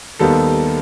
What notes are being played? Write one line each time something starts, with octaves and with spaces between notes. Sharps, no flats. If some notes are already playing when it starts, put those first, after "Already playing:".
D#2 D#3 G3 B3 A4